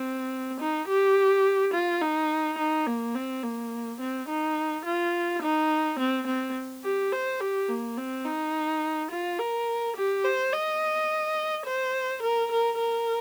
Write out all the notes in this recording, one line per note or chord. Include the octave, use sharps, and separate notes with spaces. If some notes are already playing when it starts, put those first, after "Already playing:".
Already playing: C4
D#4
G4
F4
D#4
D#4
A#3
C4
A#3
C4
D#4
F4
D#4
C4
C4
G4
C5
G4
A#3
C4
D#4
F4
A#4
G4
C5
D#5
C5
A#4
A#4
A#4